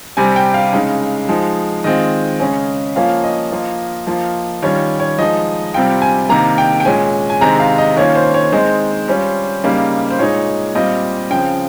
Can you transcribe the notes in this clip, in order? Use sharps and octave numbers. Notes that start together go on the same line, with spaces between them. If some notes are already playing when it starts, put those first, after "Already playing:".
C3 G3 C4 G#5
G5
F5
C#3 G#3 D#4
F3 G#3 D#4
D#3 G#3 C4 F4 D#5
C#3 G#3 C#4
F3 A#3 C#4 F4 F5
D#5
F3 A#3 F4
F3 A#3 F4
D#3 G3 C#4 F4 C#5
C#5
F3 G#3 D#4 D#5
C3 G3 C4 F4 G5
G#5
C3 D#3 A#3 A#5
G5
G5
A#2 G#3 C#4 G#5
G#5
C3 D#3 G#3 C4 A#5
F5
D#5
D#3 A#3 C#4 F4 C#5
C5
C#5
D#3 G#3 C4 D#4 C5
G3 C#4 F4
C#3 G3 A#3 D#4
C5
A#2 G#3 D#4 C#5
A#2 G3 C4 F4 D#5
C#3 F3 C4 G5